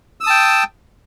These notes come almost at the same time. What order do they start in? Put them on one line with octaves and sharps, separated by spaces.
E6 D#6 A5 G5